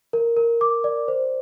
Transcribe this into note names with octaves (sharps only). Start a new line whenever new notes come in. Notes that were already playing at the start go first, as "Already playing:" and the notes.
A#4
A#4
D6
D5
C5